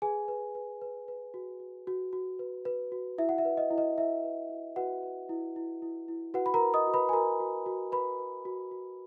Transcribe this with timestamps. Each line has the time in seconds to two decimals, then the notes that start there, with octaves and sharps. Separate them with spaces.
0.02 G#4 B4 G#5
0.28 B4
0.55 B4
0.82 B4
1.08 B4
1.34 F#4
1.60 F#4
1.87 F#4
2.13 F#4
2.39 B4
2.65 B4
2.92 F#4
3.18 E4 E5
3.29 F#5
3.38 E5
3.45 B4
3.57 D#5
3.71 E4
3.78 D#5
3.98 E4 E5
4.24 B4
4.49 E4
4.76 F#4 B4 F#5
5.03 B4
5.29 E4
5.56 E4
5.82 E4
6.08 E4
6.34 F#4 B4 F#5
6.46 B5
6.54 A#4 A#5
6.61 B4
6.74 D#5 D#6
6.87 F#4
6.94 B4 B5
7.09 G#5
7.13 F#4 A#4 A#5
7.40 F#4
7.66 F#4
7.92 B4 B5
8.19 B4
8.45 F#4
8.71 F#4